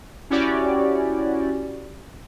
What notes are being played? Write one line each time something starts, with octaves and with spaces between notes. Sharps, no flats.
C#4 E4 F#4 G4 D5